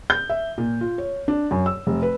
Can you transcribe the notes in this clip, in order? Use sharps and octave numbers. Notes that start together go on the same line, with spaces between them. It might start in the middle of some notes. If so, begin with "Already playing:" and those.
G6
E5
A#2
F4
C#5
D4
F#2
E6
F1
B4